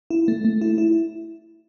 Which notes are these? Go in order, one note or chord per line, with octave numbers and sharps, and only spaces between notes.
E4
A3
A3
E4
E4